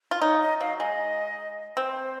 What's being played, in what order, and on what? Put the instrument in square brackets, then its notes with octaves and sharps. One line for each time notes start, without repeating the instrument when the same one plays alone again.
[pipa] F4
[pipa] D#4 [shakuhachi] C#5
[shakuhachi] D#5
[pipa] F#3 [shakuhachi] F5
[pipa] G#3 [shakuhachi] D#5
[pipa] C4 [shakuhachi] C5